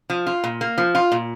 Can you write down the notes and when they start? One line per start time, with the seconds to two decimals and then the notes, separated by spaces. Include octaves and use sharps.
0.10 F3
0.27 F4
0.44 A#2
0.61 A#3
0.78 F3
0.95 F4
1.12 A#2